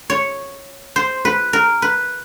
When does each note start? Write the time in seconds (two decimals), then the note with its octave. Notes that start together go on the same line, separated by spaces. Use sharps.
0.10 C#5
0.96 C5
1.25 B4
1.53 A#4
1.82 B4